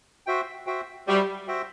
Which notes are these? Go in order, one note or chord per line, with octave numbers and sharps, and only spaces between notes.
F#4 C5 E5 G5
F#4 C5 E5 G5
G3 F#4 C5 E5 G5
F#4 C5 E5 G5